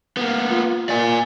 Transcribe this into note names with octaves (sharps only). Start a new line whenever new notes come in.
A#3 B3
F4
A#2 D5 G#5